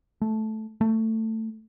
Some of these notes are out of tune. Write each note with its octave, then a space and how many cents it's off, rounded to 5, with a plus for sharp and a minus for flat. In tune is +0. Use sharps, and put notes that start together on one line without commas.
A3 -10
A3 +15